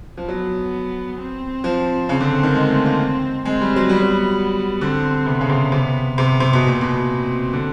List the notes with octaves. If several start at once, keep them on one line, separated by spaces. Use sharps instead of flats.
F3
F#3 B3
C4
F3
C#3 C4
D3
D#3
G#3
A3
A#3
C4
G#3 C4
G3
F#3
G3 B3
F#3
D3 C4
C3 B3
C#3
C3
C3
C3 B3
C3
B2
A#2
B2
C4
D3